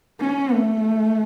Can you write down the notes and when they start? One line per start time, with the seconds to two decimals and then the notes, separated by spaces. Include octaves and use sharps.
0.20 C#4
0.53 A3